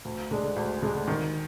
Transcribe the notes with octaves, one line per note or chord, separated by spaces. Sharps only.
D2
D3 G#3 D4
D2
D3 G#3 D4
D#3